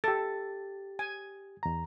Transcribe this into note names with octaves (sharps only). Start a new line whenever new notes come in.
G4 A4 A6
G#5
E2 A#5